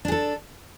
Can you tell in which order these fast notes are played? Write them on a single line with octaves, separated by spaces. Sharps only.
D4 G#4 A4